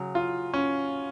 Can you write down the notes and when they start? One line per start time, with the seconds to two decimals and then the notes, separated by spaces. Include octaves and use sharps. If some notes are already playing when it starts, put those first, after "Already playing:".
Already playing: C#3 F#3
0.15 F4
0.54 C#4